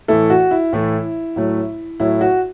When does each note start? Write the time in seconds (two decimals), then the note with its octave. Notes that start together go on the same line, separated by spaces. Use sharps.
0.08 A2 E3 A3 E4 A4
0.30 F#4
0.51 E4
0.73 A2 E3 A3
1.36 A2 F#3 A3
2.00 A2 F#3 A3 E4
2.21 F#4